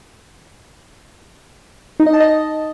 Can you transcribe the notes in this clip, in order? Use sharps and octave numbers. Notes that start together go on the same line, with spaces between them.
D#4
D#5
A5
D#5